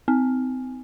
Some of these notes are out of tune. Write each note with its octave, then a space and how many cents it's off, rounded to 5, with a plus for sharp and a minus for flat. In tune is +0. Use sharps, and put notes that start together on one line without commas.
C4 -30